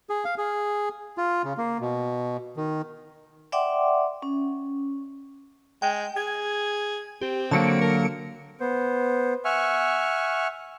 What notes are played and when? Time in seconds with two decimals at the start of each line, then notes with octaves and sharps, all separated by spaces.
0.10 G#4
0.25 F5
0.38 G#4
1.18 F4
1.44 C#3
1.58 A#3
1.81 B2
2.57 D#3
3.52 D5 E5 F#5 G5 C6 D6
4.22 C#4
5.82 G#3 G5
6.16 G#4 G#6
7.21 C4 G4
7.51 D3 F#3 A#3 A5 C#7 D7
7.81 A#4
8.60 B3 C5
9.45 E5 F#5 G#5 C#6 F6